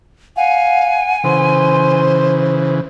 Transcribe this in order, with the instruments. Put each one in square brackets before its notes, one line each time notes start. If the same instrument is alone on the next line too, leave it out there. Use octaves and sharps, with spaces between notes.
[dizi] F5 [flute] F#5 [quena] G#5
[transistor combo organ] C#3 E3 [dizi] C5 [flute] C6